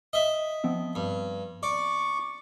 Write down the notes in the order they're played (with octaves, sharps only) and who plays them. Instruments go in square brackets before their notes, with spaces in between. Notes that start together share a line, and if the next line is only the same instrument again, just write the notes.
[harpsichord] D#5 E5
[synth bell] F3 B3 C4
[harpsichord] G2
[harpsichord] D5 [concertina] C#6 D6